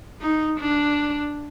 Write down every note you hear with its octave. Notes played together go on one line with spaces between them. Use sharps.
D#4
D4